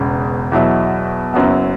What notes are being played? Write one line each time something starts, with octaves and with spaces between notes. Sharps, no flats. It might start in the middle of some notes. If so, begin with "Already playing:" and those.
Already playing: E1 E2 C#3
E2 B2 F#3 E4
F#1 F#2 F#3 B3